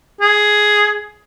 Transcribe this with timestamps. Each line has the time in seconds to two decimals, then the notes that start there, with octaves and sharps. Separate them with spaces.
0.21 G#4